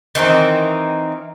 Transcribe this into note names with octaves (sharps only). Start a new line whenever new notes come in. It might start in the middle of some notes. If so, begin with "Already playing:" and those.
D#3 E3 C4 D#4